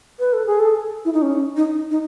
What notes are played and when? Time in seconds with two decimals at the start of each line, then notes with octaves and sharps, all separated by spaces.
0.20 B4
0.33 A4
0.46 G#4
0.60 A4
1.05 E4
1.13 D#4
1.22 C#4
1.57 D#4
1.91 D#4